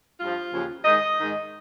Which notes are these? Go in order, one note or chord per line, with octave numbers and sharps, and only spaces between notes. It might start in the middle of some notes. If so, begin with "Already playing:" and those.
G2 F3 F4
D#2 C#3 F3
G#2 D#3 D#5
G#2 D#3